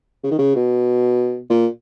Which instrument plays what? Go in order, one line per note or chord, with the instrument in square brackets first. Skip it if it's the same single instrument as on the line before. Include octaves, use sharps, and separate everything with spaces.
[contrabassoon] C#3
D#3
C#3
B2
A#2